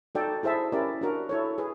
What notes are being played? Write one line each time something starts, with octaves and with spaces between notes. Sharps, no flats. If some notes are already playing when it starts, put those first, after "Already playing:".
D#4 F#4 A4 D5 G5
E4 G#4 C5 E5 A5
C#4 E4 G4 A#4 D5
D4 F#4 A#4
E4 A4 C#5
G#4 B4